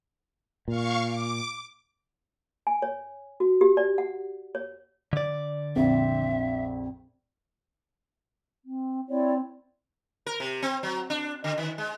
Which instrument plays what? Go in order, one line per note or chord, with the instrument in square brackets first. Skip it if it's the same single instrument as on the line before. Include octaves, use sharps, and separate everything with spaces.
[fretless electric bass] A#2 [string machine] F5 C#6
[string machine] D6
[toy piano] G#5
C#5
F#4
G4
D5
F#5
C#5
[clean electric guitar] D3 D5
[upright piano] A#1 F2 [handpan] C4 [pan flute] E5
[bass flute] C4
[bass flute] C4 [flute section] E4 C#5 D5
[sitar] A#4
C3
C4
F#3
D4
D3
D#3
G#3